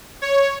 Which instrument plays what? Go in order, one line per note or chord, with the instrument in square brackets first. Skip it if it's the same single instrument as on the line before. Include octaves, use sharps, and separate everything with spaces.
[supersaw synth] C#5